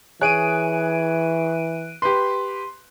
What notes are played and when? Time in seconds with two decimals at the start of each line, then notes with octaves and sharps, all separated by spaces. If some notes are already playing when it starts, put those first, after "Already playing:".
0.21 E3 G#4 C#5 F#6 D7 D#7
2.02 G4 B4 C6